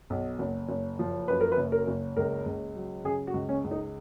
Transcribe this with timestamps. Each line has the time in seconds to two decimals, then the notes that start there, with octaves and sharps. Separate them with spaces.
0.10 B1
0.39 F#1
0.69 F#1
0.99 F3
1.28 F#2 B4
1.41 A#4
1.52 B4
1.57 F#1
1.72 A#4
1.88 F#1
2.17 C#2 A#4
2.46 C#2
2.75 F#3
3.04 C#3 G#4
3.27 F#4
3.34 C#2
3.49 C#4
3.64 C#2
3.71 D#4